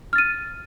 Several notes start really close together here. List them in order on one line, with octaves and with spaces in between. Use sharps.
F6 A6 D#7